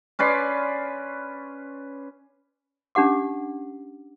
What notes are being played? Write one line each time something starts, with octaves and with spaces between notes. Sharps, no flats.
C#4 B4 D5 C6
C#4 D4 G4 F#5 D6